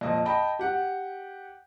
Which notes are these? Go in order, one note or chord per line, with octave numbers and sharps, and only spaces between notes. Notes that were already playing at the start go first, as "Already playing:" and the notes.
F2 A#2 D#5
D#5 G5 A5 B5
G4 F#5